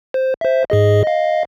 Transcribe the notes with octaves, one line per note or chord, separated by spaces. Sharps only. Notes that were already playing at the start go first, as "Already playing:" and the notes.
C5
C5 E5
G#2 G#4 D#5
D#5 F5